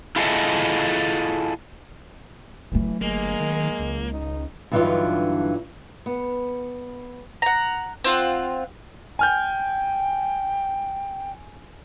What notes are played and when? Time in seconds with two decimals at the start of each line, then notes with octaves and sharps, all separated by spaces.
0.16 E4 F4 G#4 A4 D#5 E5
2.72 F#1 E3 F#3 A3
3.01 G1 G#3 A#3
3.40 D#3
3.79 C#2
4.10 D#4
4.72 G2 D3 E3 F#3 D#4 F4
6.06 B3
7.42 F#5 A#5
8.04 C4 F4 F#5
9.19 G5 G#5 F6 G6